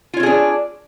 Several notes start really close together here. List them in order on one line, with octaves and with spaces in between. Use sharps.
F4 C#5 C4 G#4 D4